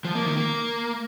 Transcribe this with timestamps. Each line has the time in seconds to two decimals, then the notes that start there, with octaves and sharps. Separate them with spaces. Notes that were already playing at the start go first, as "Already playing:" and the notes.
0.05 F3
0.15 A#3
0.26 D#3
0.37 A#3